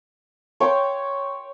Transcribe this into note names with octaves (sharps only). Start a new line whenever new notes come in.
C#5 G5 C6 D6